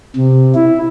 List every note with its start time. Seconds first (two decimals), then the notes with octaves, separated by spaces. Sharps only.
0.16 C3
0.55 E4